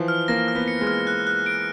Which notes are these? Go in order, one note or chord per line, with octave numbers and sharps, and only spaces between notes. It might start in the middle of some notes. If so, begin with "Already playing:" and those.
Already playing: E3 F3
F6
A#3 A#6
F6
B3
C#7
G#3
F6
F#6
F#6
D7